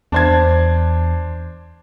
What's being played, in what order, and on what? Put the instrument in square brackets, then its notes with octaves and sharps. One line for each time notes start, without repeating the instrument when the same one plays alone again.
[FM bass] E2 [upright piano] D4 C5 G#6